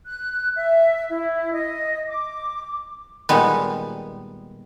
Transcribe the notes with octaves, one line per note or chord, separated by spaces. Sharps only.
F#6
E5
E4
D#5
D6
A#2 D#3 G3 G#3 B3